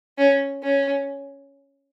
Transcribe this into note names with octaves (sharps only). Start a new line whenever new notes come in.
C#4
C#4